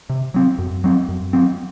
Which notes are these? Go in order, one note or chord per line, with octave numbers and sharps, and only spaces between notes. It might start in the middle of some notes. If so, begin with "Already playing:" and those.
C3
F#3 C4
F#2
F#3 C4
F#2
F#3 C4